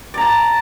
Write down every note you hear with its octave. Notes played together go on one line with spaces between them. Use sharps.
D5 A5 A#5